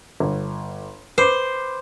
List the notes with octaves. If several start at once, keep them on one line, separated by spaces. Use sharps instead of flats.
G1
B4 C5 D6